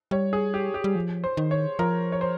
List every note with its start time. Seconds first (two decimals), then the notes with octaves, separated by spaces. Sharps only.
0.11 G3 C#5
0.33 G#4
0.54 G4
0.74 G4
0.84 G3
0.95 F3
1.24 C5
1.37 D#3
1.51 C#5
1.79 F3 A#4
2.12 C#5
2.21 C5